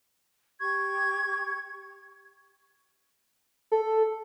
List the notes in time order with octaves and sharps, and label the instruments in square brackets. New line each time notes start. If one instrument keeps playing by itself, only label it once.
[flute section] G4 C#6 G#6
[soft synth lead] A4